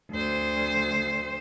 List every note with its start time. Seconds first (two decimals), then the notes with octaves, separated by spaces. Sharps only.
0.11 D2 C5